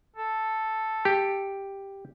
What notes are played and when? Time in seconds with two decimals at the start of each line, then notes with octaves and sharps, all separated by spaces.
0.16 A4
1.05 G4